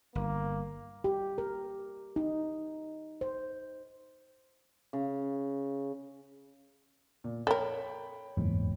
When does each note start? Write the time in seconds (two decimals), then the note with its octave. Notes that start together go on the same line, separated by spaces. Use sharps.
0.15 G1 A#3
1.04 G4
1.38 A#4
2.16 D#4
3.21 C5
4.93 C#3
7.24 A#2
7.47 A4 A#4 C#5 G5 B5
8.37 F#1 E2 G#2